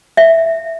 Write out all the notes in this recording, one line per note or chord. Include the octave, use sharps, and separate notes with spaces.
E5